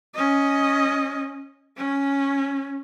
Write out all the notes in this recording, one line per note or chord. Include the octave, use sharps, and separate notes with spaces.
C#4 D#5
C#4